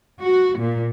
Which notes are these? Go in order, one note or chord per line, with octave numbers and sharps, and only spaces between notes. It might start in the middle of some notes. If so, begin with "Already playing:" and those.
F#4
A#2